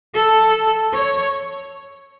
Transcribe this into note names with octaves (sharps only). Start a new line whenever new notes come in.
A4
C#5